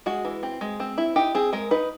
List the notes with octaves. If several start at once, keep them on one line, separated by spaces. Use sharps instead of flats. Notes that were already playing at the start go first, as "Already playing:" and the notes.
G#3 F#4
E3
C4
G#3
C4
E4
D#4 G4
C4 G#4
G#3 A#4
D#4 B4